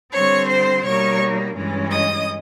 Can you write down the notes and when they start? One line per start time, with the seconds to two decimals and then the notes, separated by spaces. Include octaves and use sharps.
0.13 D3 G3 C4 C#5 C#6
0.48 C5 C6
0.84 B2 G3 A#3 D#4 C#5 C#6
1.55 G2 E3 G#3 C#4
1.91 D#5 D#6